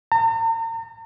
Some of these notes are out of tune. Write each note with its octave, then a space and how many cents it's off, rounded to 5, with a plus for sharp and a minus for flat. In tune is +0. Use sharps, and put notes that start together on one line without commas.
A#5 -45